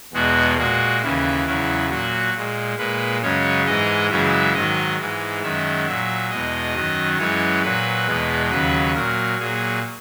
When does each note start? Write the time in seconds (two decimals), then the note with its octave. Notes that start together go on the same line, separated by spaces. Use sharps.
0.13 E2 B2 G#3 F#4
0.58 A#2 G#3 F#4
1.02 D#2 C#3 E3 E4
1.46 E2 C#3 F#3 E4
1.90 A#2 F#3 F#4
2.34 A#2 G#3
2.78 A#2 G#3 B4
3.22 F#2 C#3 G#3 C#5
3.66 G#2 E3 G#3 D#5
4.10 F#2 C#3 E3 G#3 E5
4.54 G#2 D#3 F#3 D#5
4.98 G#2 E3 G#3
5.42 F#2 D#3 G#3 E5
5.87 A#2 F#3 E5
6.30 E2 B2 G#3 D#5
6.75 F#2 D#3 F#3
7.19 F#2 E3 G#3 C#5
7.62 A#2 F#3 B4
8.07 E2 B2 G#3
8.51 D#2 C#3 F#3 B4
8.95 A#2 F#3 A#4
9.39 A#2 F#3 G#4